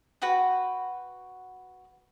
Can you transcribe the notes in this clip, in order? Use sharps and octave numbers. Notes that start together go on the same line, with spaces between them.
F#4 B4 F#5 G5